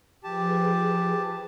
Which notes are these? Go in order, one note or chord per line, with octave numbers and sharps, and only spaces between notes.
F3 G4 G#4 B4 A5